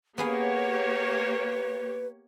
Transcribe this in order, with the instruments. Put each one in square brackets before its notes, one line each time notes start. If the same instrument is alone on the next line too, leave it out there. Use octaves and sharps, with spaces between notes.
[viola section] A#3 G4 C#5 [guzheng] B3 G#4 F5 [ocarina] B4